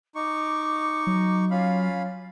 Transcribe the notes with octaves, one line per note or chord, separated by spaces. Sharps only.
D#4 C#6 D6
F#3
C#4 F4 F5 B5